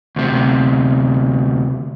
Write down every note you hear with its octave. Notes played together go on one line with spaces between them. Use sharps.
D2 C3